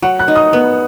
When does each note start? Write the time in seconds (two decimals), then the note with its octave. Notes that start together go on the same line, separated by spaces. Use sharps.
0.02 F#3 F#5
0.19 F#6
0.28 D#4
0.36 D#6
0.53 B3